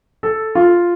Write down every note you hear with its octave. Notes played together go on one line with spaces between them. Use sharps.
A4
F4